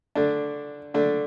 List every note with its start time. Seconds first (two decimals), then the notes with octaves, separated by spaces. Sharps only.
0.15 D3 A3 D4
0.94 D3 A3 D4